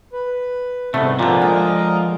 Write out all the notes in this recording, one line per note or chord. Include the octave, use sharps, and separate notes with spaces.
B4
C2 G#2 C3 A3 B3 F#5
A#2 D3 F3
G#3 A#4 D#5 A#5